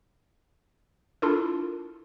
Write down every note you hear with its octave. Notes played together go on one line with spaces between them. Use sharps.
D4 E4 F4 A4 A#4